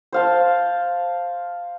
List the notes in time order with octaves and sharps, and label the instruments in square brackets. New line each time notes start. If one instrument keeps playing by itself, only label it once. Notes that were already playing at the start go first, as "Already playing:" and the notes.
[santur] C5 F5 A5